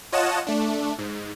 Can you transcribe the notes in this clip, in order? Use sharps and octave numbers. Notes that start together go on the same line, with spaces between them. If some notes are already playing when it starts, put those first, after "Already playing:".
F4 C#5 D#5 F#5 A5 E7
A3 D4
G#2